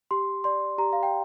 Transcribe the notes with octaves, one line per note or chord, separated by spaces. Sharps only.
G4 C6
D5 C6
G4 A#5
F5
G5